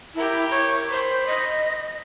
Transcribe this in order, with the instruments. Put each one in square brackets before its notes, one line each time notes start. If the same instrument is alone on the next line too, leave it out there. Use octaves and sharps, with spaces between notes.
[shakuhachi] E4 [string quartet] G4 A#4
[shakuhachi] C#5
[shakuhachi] C5 [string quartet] B5
[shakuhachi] D#5